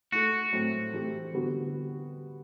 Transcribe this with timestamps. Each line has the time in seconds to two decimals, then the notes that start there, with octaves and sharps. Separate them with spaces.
0.12 A3 E4 F#4 A4
0.53 A2 F#3 A3 C4
0.93 E3 A3 C4 G4
1.33 D3 G3 B3 F#4